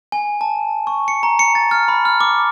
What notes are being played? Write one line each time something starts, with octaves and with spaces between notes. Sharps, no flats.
G#5
A5
C#6
C#7
A#5
C#7
A6
F6
B5
F6
D6